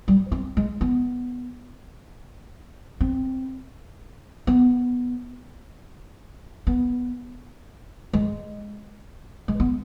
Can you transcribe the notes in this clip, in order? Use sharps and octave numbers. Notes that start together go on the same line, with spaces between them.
G3
C4
G#3
B3
C4
B3
B3
G#3
G#3
B3